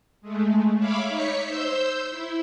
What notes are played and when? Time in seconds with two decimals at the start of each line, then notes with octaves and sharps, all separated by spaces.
0.21 G#3 A3
0.77 C#5 E5 F5 B5 D6
1.08 D#4 C#5 B6 C#7
1.44 C5 E6 G6
2.10 E4